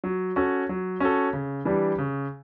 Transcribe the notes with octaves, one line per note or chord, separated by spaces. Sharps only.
F#3
C#4 F#4 A4
F#3
C#4 F#4 A4
C#3
E3 G3 D4 G4
C#3